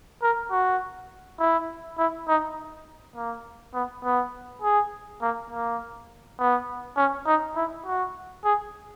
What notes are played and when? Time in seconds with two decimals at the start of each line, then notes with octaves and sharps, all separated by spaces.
0.23 A#4
0.51 F#4
1.40 E4
1.98 E4
2.28 D#4
3.16 A#3
3.74 B3
4.04 B3
4.62 G#4
5.22 A#3
5.51 A#3
6.39 B3
6.97 C#4
7.26 D#4
7.56 E4
7.86 F#4
8.45 G#4